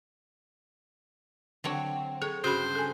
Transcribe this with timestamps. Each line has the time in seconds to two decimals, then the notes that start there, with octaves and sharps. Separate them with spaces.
1.64 D3 F#3 C4 C#5
2.22 G#4 A4 C#5
2.44 G2 C#3 F#4 G#4 C5 B5
2.75 A4 G#5